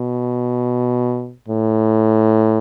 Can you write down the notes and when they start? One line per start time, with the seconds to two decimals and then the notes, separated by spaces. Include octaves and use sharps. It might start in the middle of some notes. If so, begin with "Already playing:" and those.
Already playing: B2
1.48 A2